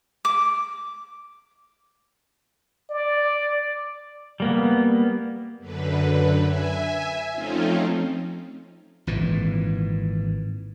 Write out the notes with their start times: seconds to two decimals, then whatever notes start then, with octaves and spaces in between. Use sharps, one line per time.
0.25 D6
2.90 D5
4.40 G3 A#3 B3
5.58 F#2 D3 B4
6.43 E5 G#5
7.32 F3 A3 C4 C#4 D#4 F4
9.07 G#1 A#2 E3